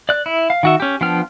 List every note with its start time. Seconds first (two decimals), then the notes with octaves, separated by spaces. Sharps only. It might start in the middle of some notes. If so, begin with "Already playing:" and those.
0.09 D5 F#6
0.26 E4
0.50 F5
0.63 D#3 F#4 E5
0.80 C#4 G4
1.01 F3 B3 D4 G5 F6